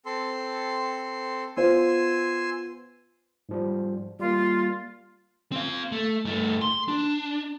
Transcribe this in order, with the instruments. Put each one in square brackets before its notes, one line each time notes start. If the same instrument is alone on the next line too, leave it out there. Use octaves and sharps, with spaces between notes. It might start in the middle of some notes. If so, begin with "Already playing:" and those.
[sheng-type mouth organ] C4 A4 C6
[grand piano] B3 F4 C5 [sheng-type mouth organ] G#5 C6 E6
[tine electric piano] G#2 F3 G3
[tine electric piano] G3 A#3 [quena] F4
[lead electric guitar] C4 F5
A3
G2 A3
C6
D4